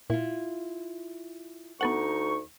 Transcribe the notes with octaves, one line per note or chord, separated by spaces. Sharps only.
A#2 E4 F4
D2 B3 D#4 A4 F#5 C#6